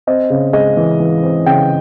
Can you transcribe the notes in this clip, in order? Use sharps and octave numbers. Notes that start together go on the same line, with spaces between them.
C4 D#5
C#3
G#3 D#5
E3
E3
C4
C#3 G5